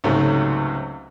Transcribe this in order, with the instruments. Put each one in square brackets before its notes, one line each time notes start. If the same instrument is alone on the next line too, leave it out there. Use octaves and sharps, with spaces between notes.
[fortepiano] C#2 G#2 C3 F#3 A3